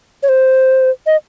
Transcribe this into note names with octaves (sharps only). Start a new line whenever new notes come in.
C#5
C5
D#5